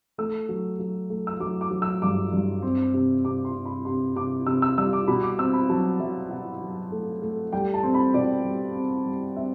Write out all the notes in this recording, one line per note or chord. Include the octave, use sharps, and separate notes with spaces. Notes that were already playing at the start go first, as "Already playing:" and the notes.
A3 E6
F#3
F#3
A3
E6
F#3 D6
D6
F#3
E6
G2 D6
G2
C4
C3
C3 D6
C6
C3
B5
C3 C6
C3 D6
C3 E6
E6
G3 E6
D6
B2 B5
D6
C4 E6
B5
F#3 A5
F#3 E5
E5
B2 F#5
F#3
A3
A3
G3 G5
A5
C4
B5
B2 D5
G3
C4
G3
C4 E5